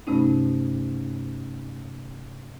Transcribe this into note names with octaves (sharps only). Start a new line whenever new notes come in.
G2 C3 A3 C#4 D#4